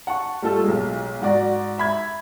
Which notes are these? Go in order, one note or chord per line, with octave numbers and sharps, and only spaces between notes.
F#5 A5 C#6
G3 A3 F4 A4
B1 G#3
G#2 F#4 D5
E5 B5 G#6